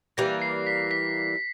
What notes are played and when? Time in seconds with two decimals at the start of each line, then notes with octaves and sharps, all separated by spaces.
0.17 E3 G3 A#3 A#6
0.42 C7
0.67 B6
0.91 B6